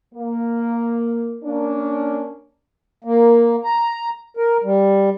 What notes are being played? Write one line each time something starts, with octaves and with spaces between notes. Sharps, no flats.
A#3
A#3 C#4 D4
A#3
A#5
A#4
G3